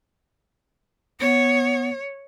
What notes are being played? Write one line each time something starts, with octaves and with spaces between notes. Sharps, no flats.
B3 C#5